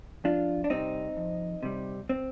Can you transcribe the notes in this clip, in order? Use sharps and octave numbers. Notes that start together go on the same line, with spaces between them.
F2 D4 F4
D4
C3 G3 C4 D#4
F2
C3 G3
C4